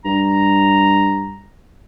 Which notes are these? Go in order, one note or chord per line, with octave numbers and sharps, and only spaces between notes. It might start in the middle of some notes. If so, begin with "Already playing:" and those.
G2 A#5